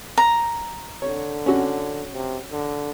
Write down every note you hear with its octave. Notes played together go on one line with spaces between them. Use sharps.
A#5
D3 C#5
C#4 F#4
C3
D3